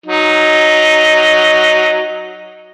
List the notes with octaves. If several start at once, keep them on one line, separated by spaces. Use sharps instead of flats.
F#3 D#4